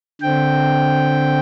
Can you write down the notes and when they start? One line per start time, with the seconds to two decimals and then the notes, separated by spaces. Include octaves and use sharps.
0.21 D3 C4 G5